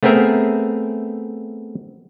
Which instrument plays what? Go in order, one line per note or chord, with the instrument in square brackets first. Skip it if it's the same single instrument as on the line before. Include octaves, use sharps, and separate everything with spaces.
[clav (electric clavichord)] A3 B3 C4 G#4 A#4 E5